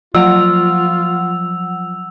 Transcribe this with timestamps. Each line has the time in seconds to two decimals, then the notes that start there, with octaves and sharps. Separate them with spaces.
0.15 F3 F#3 F4 F#5 E6 F7